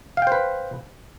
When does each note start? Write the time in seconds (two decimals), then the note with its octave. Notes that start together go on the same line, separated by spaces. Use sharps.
0.17 F5
0.22 G5
0.27 C5
0.32 B4